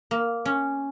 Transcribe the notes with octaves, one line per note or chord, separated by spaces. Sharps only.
A#3
C#4